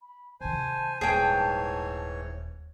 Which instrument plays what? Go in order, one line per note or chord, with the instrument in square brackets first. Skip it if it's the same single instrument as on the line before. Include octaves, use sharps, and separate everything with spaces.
[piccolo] B5
[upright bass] C3 D#3 [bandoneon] C5 G#5 [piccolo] A5
[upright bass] D#1 [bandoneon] G#2 E3 C#5 [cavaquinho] G#4 G5